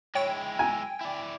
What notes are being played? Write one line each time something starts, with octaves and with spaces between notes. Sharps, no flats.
G#3 E4 C#5 G5
G#5
E4 D5